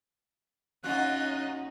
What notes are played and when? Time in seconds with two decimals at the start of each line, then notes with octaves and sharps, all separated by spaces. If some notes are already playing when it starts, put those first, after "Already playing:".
0.84 F#2 C#4 D#4 F4 F#4 D#5 F#6